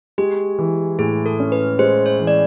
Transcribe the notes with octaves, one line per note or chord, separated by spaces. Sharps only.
G#3 G4
E3
A2 G#4
A4
C#4
B4
G#3 C5
C#5
E3
D5